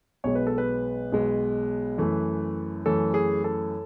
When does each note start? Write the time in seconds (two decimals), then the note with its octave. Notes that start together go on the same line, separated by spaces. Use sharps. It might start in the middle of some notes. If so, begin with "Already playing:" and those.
0.24 B1 B2 G#3 C#5
0.35 B4
0.47 A4
0.58 B4
1.12 B1 B2 G#3
1.98 F#2 E3 A3
2.86 F#2 E3 A3 A4
3.14 G#4
3.44 A4